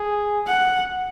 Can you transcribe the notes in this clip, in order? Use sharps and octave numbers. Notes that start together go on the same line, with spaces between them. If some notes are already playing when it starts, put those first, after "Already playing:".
Already playing: G#4
F#5